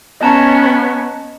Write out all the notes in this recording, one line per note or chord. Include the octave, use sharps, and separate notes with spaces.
B3 C#4 D#5 A5 A#5